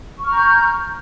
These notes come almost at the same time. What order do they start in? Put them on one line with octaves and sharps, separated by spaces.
C#6 F6 A#5 G6